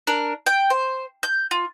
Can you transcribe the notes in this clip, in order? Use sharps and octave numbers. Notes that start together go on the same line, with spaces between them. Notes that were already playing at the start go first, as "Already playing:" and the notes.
D4 A#4
G5
C5
G6
F4